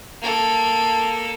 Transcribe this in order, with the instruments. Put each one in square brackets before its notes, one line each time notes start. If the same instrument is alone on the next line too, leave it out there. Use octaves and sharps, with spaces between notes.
[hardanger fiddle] A#3 A4